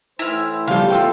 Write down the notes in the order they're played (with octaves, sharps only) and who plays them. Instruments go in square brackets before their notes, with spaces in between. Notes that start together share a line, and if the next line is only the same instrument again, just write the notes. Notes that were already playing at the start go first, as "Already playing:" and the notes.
[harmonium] A2 E3 C5 [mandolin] E4 F6
[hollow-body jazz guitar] C#3 F3 G3 [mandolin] F5
[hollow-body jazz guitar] F4 A4 G5